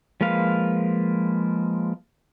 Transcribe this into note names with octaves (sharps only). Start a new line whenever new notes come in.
F3 G#3 A#3 B4 F5